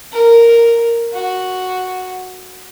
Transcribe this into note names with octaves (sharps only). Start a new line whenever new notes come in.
A#4
F#4